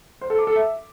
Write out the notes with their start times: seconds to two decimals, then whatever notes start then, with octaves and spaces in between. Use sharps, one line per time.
0.21 C5
0.30 A4
0.39 D6
0.47 A4
0.56 E5